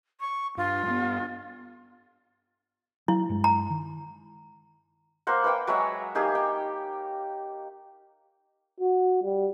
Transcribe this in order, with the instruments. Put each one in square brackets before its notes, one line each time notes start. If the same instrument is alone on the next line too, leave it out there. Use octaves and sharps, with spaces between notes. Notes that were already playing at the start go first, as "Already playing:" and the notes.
[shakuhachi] C#6
[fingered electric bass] G2 [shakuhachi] F4
[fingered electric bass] G2 A3 B3
[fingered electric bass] F#3 [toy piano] E4
[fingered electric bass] G2 G#3
[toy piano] A#5
[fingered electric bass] D#3
[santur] A#3 C5 F#5
B4 F#5 G5 D6
F#3 G#3 C#5 E5
A#3 D#4 G4 G#4
D#4 G5
[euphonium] F#4
G3